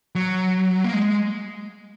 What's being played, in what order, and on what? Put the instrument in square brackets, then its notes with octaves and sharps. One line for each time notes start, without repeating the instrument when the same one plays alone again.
[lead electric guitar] F#3
A#3
G#3